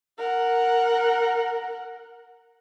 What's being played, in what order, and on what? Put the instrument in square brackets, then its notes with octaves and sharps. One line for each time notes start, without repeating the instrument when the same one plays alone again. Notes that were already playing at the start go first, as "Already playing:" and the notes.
[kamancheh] A#4 F#5